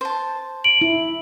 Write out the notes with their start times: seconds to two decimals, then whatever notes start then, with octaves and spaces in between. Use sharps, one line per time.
0.01 C5 A5
0.64 D7 F#7
0.81 E4